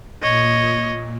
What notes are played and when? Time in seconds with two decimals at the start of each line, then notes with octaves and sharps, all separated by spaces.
0.22 A#2 C#5 D#5